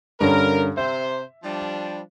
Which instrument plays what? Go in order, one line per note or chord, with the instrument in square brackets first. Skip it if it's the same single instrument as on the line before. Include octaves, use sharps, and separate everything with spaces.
[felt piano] G2 D3 C#4 [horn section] A#4
[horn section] C3 C5 [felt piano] E5
[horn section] F3 G3 D4